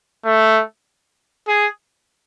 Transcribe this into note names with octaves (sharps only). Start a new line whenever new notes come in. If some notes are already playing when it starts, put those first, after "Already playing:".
A3
G#4